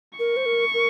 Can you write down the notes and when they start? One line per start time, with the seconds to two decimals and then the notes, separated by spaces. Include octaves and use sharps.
0.19 A#4 C#6
0.37 C5
0.46 A#4
0.74 A#4